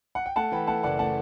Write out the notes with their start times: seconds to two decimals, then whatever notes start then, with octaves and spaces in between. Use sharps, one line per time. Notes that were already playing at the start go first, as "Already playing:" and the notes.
0.15 F#5
0.26 G5
0.36 A3 F#5 A5
0.52 E3 G5 B5
0.67 A3 F#5 A5
0.83 F#1 D5 F#5
0.99 A3 F#5 A5